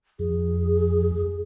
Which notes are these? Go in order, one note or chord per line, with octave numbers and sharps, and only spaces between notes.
F2 G#4